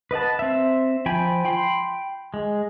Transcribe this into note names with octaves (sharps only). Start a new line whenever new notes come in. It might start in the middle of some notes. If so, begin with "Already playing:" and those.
B4 D#5 F#5 A5
C4 E5
F3 G5 G#5 B5
G5 B5 C6
G#3